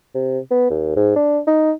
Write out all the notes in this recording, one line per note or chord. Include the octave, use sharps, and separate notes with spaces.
C3
B3
D#2
G#2
D4
D#4